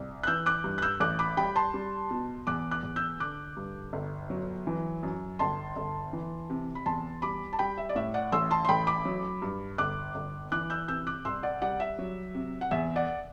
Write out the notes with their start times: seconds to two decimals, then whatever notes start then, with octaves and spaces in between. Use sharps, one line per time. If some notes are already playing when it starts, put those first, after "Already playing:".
Already playing: C2
0.23 F#6
0.27 E3 E6 G6
0.46 D6 F#6
0.64 G2
0.78 F#6
0.82 E6 G6
1.00 A1 D6 F#6
1.19 B5 D6
1.37 G3 G5 B5
1.56 A5 C6
1.74 G3
2.11 B2
2.47 E2 D6 F#6
2.71 D6 F#6
2.83 E2
2.96 E6 G6
3.20 D3 D6 F#6
3.57 G2
3.93 G1
4.30 F#3
4.67 E3
5.03 F#2
5.39 G1 A5 C6
5.76 G1
6.13 E3
6.50 C3
6.75 B5
6.86 E2 A5 C6
7.22 G3 B5 D6
7.53 A5
7.59 G3 G5 B5
7.78 E5
7.89 D5
7.95 A2 E5
8.14 D5 F#5
8.32 A1 C6 E6
8.51 A5 C6
8.65 C6
8.69 A1 G5 B5
8.87 B5 D6
9.05 F#3
9.42 G2
9.78 G1 D6 F#6
10.15 G1
10.52 E3 D6 F#6
10.70 E6 G6
10.88 C3 E6 G6
11.07 D6 F#6
11.25 C2 C6 E6
11.43 D5 F#5
11.62 G3 D5 F#5
11.80 E5
11.98 F#3
12.35 C3
12.61 F#5
12.71 E2 E5
12.96 D5 F#5